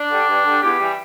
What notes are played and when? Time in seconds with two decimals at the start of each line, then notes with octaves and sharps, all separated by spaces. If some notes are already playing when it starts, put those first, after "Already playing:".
Already playing: D4
0.08 D3 G3
0.26 G2
0.44 D3 G3
0.61 E2 G4
0.79 E3 G3